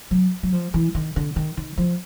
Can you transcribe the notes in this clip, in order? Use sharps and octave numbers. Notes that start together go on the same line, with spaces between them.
F#3
F#3
F3
E3
D#3
D3
D#3
D#3
F3